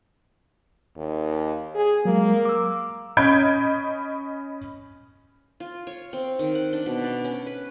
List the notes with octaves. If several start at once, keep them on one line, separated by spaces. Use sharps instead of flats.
D#2
G#4
F#3 G#3 A#3
D6 E6
C#4 D#5 B5 G6 G#6 D7
F4
C#5
C4
D#3
F#5
D4
B2
D5
C#4
B4